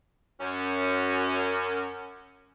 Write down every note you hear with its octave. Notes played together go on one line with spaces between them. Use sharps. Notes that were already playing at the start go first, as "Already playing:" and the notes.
F#2 C#4